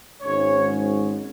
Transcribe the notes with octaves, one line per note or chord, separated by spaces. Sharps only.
G#1 G#2 G#3 C#4 C#5